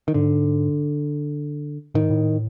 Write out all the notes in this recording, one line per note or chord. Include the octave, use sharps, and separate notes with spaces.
D#3
G#2 D3
A2 D#3
G#2
A2